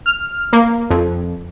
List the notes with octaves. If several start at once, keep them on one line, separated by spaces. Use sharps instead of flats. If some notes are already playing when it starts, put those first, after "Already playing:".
F6
A#3
F2